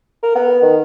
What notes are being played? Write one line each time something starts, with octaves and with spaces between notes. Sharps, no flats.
A#4
B3
D#3